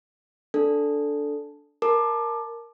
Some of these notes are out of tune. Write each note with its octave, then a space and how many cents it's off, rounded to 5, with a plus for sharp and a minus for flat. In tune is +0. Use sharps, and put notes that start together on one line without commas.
D4 -10 A4 +0
A#4 +0 A5 -15 D6 +20